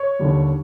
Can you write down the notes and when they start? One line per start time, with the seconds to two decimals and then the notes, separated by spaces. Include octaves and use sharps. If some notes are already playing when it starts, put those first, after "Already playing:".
Already playing: C#5 C#6
0.19 D#2 D3 G3